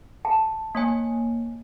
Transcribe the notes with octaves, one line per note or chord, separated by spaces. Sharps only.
A5
A#3 C#5 G#5